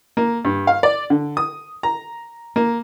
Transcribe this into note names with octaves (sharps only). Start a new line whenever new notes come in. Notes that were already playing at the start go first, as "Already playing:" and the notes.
A#3
G2
F5
D5
D3
D#6
A#5
A#3